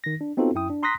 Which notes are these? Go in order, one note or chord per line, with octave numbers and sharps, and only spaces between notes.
D#3 A#6
D4
B3 C4 D#4 F4 F#4 A4
F#2 E4 G5 D#6
D4
A#5 C6 D#6 F#6 A#6 B6